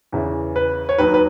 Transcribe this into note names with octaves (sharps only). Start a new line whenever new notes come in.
E2 C#3 E3
B4
C#5
D#2 D#3 F#3 B4
B4